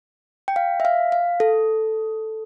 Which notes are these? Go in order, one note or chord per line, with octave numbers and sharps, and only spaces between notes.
G5
F5
E5
F5
F5
A4